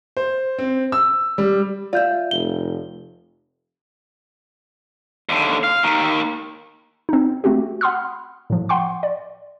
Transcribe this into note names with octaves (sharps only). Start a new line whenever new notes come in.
C5
C4
E6
G3
F4 D5 E5 G6
F1 G7
D#2 D3
F5
D#2 D#3
C4 D#4
A3 C4 F#4 G4
F#5 B5 C6 D#6 F6
A2 F3
F#5 G5 C6 C#6
D5